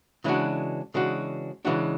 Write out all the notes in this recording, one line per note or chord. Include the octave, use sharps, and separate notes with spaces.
C#3 E3 G#3 D4 F#4
C#3 E3 G#3 D4 F#4
C#3 E3 G#3 D4 F#4